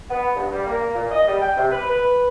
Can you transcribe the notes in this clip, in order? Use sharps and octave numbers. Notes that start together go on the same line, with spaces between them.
B3
G2
G3
A#3
A#2
D#5
G3
G5
C3
B4
B4